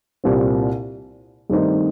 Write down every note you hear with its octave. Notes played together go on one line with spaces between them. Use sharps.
C2 A#2 G3 C4
G2 D#3 A3 C4 D#4